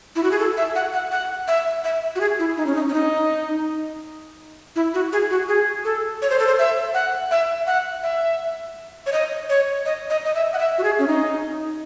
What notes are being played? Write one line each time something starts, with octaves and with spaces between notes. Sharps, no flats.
E4
F#4
G#4
A4
E5
F#5
F#5
F#5
E5
E5
F#4
G#4
E4
D#4
C#4
D#4
C#4
D#4
E4
F#4
G#4
F#4
G#4
A4
C#5
C5
A4
C5
E5
F#5
E5
F#5
E5
C#5
D#5
C#5
D#5
D#5
D#5
E5
F#5
E5
F#4
G#4
C#4
D#4